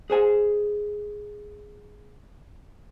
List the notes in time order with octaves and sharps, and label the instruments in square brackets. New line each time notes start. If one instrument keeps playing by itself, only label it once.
[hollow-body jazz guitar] G#4 C5 G#5